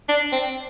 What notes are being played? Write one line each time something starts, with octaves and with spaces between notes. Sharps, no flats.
D4
C4